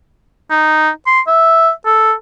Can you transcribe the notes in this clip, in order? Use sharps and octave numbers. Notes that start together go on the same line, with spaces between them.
D#4
C6
E5
A4